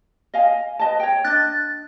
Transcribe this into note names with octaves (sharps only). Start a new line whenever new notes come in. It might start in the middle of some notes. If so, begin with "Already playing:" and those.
D#5 F5 G#5
B4 D#5 A5
C#5 G5
D4 D#5 F#6 A6